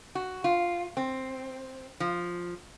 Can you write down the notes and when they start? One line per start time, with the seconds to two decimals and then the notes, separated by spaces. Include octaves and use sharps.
0.15 F#4
0.44 F4
0.97 C4
2.00 F3